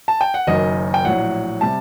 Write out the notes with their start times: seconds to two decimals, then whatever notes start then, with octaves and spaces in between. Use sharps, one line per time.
0.08 A5
0.21 G5
0.34 F#5
0.47 F#1 F#2 D#3 F#3 D#5
0.94 G5
1.04 A#1 A2 F#3 F#5
1.61 C3 G3 A5